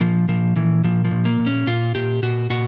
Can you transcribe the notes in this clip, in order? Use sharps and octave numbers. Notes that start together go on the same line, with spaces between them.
A#2 F3
A#2 F3
A#2 E3
A#2 F3
F3
A#2
A#3
A#2
C#4
A#2 F4
A#2 G4
A#2 F#4
A#2 F#4